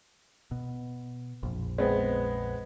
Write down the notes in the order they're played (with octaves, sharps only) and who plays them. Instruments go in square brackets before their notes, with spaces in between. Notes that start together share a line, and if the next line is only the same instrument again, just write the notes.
[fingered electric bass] B2
A#1 F2
[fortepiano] G#3 B3 C4